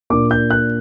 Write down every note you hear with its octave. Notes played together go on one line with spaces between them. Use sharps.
A#2 A#3 D4 D6
G6
F#6